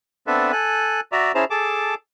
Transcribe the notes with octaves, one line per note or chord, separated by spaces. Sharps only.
B3 C4 D4 A4 B4 E5
A4 G#5 F#6
F#4 D5 E5 A#5
C#4 E4 G#4 C5 A5 A#5
G#4 A4 A5 D6